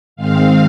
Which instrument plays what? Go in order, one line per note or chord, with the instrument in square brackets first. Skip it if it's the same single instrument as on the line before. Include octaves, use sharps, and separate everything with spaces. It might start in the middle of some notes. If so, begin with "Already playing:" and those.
[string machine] G#2 D#3 G#3 C4 F5